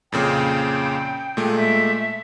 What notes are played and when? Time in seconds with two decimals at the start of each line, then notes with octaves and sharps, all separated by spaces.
0.12 F2 A#2 C#3 G5
1.37 A#2 G#3 A3
1.56 E5